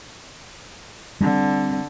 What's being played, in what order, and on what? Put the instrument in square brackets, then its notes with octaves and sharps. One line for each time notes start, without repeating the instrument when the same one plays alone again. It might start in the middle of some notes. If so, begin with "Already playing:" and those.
[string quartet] D3 [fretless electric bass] G3 C4 D4